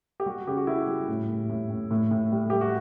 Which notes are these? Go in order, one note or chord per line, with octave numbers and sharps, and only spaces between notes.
G4
G3 F#4
C#3 G4
F#4
G3 E4
G3
A2
A2
A2
A2
A2
A2
G3
G3 G4
F#4